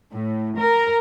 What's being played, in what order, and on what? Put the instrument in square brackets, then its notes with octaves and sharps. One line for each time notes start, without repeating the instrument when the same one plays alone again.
[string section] A2
A#4